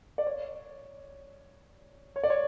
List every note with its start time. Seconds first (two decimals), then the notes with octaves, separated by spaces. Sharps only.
0.18 D5
0.26 C#5
2.16 C#5
2.23 D5
2.30 C#5